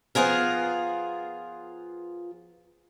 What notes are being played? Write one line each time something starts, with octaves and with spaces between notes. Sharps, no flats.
F3 B3 F4 G#4 A#4